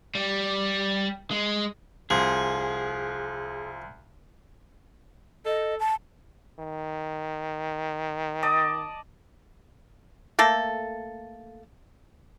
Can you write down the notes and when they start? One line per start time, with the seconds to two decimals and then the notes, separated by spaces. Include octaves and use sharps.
0.15 G3
1.31 G#3
2.10 C2 F3 G#4
5.46 A4 D#5
5.79 A5
6.59 D#3
8.42 D5 D#5 A5
10.39 A3 A#3 A4